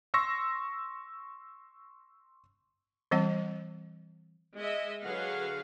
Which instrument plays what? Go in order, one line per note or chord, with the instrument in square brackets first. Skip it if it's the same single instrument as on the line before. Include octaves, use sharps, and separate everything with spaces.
[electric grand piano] C6 C#6 E6 A#6
[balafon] E3 G3 C4 F#5
[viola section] G#3 D#5 E5
D3 F#3 G#4 B4 F5 F#5